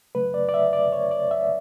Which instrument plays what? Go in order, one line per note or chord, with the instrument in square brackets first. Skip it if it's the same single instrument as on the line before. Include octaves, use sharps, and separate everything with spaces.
[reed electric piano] C#3 F#3 A3 B4
D5
D5
E5
D5
C#5
D5
E5